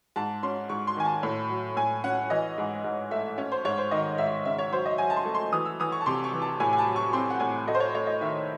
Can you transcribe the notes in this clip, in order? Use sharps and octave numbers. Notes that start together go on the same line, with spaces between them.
G#2 A5
C#4 C6
G#2 C#6
C6
D#3 G#5
A5
A2
F#3
A2 G#5
C#4 F#5
E3 D#5
G#2
G#2
A3 E5
C#4 C#5
C5
G#2 C#5
C5
D#3 D#5
G#2 E5
C#3 E5
C#5
F#3 C5
D#5
F#3 G#5
A5
C6
A3
C6
E3 D#6
E6
E3 D#6
C#6
A5
C3 C6
C#6
E3
A5
A2 G#5
G#5
A5
F#3
C#6
C4 C6
F#5
A2 G#5
A3 D#5
C5
C#5
A3 C#5
D#5
D#3 E5